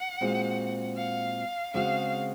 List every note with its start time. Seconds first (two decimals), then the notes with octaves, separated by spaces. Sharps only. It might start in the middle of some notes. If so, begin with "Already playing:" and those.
Already playing: F#5
0.21 A#2 G#3 C4 F#4
0.97 F5
1.74 C#3 G#3 C4 F#4 F5